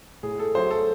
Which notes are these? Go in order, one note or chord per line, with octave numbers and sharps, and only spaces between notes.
A2 G#4
A4
F#3 A3 C5
A4